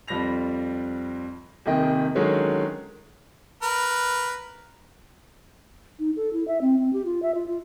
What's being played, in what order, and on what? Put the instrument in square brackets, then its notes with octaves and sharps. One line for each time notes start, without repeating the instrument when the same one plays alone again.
[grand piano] F2 F3 G3 B5 A#6 F7
D#1 C2 C3 D#3 D#5 G5
D3 D#3 F#3 G#3 C#4 G#4
[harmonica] A#4 B4
[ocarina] D#4
A4
E4
E5
C4
C4
G4
F4
E5
F4
F4